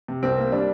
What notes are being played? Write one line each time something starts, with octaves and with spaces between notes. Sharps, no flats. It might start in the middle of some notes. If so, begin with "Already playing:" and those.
C3
C2 C4
A#3
G3 D4